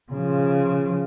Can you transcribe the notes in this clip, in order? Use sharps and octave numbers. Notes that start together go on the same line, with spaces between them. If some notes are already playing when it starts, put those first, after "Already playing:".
C#3 F3